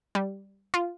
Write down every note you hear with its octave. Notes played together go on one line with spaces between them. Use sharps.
G3
F4